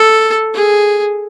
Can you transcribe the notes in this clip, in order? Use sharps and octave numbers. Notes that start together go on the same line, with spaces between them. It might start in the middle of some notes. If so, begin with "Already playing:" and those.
Already playing: A4
G#4